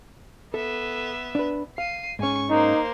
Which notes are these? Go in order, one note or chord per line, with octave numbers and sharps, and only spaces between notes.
B3 A4 E5
D4 B4
F5 C7 D#7
G#2 C#4 G#5 C#6
A#3 D#4 C5